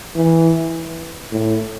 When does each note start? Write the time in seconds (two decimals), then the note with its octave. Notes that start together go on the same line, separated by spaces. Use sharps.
0.15 E3
1.32 A2